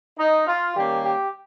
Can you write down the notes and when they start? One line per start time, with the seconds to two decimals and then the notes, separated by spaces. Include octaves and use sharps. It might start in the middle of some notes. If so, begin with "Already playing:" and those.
0.18 D#4
0.47 F4
0.75 D#3 G3 A#3 C#4 G4
1.03 G4